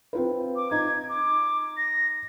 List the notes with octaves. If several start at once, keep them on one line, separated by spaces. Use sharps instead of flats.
C4 F4 B4
D6
D#4 G#6
D6
A#6